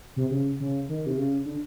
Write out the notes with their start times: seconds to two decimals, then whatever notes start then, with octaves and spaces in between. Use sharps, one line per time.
0.16 C3
0.31 C#3
0.60 C#3
0.89 D#3
1.06 C3
1.17 C#3
1.45 D3